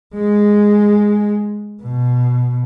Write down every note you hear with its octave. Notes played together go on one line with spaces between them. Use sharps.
G#3
B2